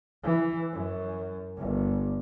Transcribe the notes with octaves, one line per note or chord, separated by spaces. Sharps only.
E3
F#2
G1